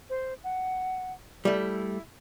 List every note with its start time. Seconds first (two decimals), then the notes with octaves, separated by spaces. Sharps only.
0.10 C5
0.44 F#5
1.45 G3 A3 E4